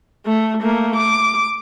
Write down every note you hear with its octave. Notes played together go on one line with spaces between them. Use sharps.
A3
A3 A#3
D6